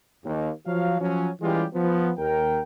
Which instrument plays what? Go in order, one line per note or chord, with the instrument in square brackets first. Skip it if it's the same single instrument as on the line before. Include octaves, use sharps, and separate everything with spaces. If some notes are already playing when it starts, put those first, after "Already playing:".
[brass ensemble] D#2
F3 F#3 F5
F3 F#3 C#4
E3 G3 G#3 C#4 F4 G4
F3 B3
D#2 A#4 G5